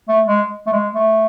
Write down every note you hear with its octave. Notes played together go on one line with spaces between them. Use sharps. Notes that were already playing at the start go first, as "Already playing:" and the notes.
A3
G#3
A3
G#3
A3